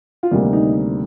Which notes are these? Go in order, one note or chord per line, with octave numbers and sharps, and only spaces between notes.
F4
D2 C3 D#3 G3 A#3 D#4
D#4